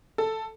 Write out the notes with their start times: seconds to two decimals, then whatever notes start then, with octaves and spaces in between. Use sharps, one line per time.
0.18 A4